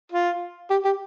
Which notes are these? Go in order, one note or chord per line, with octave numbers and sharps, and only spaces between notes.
F4
G4
G4